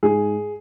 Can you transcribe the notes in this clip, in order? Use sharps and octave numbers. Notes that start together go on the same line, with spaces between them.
G#2 G#4